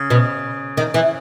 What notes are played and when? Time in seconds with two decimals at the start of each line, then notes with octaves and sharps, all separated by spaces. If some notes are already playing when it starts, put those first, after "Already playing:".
Already playing: C#3
0.10 B2
0.77 D#3
0.94 E3